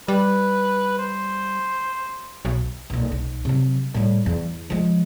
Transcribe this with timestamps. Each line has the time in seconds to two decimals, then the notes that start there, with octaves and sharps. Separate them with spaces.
0.08 G3 B4
0.98 C5
2.45 B1
2.90 B1 A#2
3.12 B1
3.45 C3 F#3
3.94 A2 G3
4.26 E2
4.70 F3 G#3